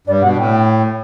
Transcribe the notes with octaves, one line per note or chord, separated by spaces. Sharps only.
G2 D5
B2 F#5
A2 G5